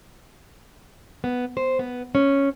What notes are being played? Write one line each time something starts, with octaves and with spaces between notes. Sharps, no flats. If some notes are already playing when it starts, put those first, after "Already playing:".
B3
C5
B3
C#4